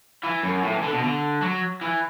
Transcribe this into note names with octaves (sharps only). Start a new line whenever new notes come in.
E3
F#2
A2
E3
D3
B2
D3
F#3
E3